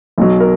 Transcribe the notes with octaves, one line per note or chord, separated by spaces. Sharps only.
B1 B2 F#3
A#4